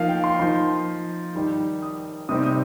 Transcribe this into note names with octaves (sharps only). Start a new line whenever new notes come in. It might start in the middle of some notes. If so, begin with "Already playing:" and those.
Already playing: F3 A#3 D#4 F5
G5
C6
F3 D#4 C6
D#3 G3 D#4
D#6
C3 G3 C4 D#4 D#6
D#6